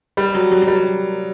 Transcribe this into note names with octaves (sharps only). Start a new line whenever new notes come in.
G3
F#3
F#3
F#3
G3